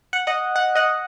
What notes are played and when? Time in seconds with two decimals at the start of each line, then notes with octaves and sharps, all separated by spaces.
0.13 F#5
0.27 D#5 F#5
0.56 F#5
0.75 D#5 F#5